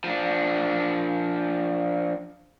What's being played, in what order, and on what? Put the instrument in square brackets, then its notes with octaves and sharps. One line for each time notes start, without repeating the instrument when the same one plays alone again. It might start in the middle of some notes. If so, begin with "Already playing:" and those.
[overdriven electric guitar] F3 D4